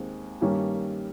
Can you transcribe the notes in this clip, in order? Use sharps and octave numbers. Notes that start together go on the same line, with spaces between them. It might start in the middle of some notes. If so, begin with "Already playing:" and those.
Already playing: D#2 D#3 G#3 C4
G2 D#3 G3 A#3 C#4